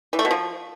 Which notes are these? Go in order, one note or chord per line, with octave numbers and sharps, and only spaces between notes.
E3
A3
B2
F3